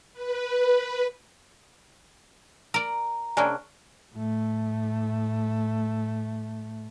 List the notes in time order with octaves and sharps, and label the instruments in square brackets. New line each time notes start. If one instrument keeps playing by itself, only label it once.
[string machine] B4
[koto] A#4 D5 [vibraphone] A#5
[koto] C3 A#3 [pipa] G#3 C#4 D4
[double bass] A2 A3